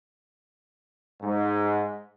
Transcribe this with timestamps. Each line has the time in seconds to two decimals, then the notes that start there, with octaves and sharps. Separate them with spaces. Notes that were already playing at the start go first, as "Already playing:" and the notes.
1.22 G#2